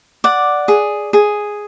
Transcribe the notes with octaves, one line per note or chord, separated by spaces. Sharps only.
D5 F#5
G#4
G#4